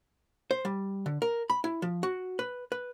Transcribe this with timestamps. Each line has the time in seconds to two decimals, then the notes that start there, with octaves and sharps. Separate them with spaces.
0.51 C5
0.65 G3
1.06 D3
1.22 A#4
1.50 B5
1.64 E4
1.82 F3
2.03 F#4
2.39 B4
2.72 B4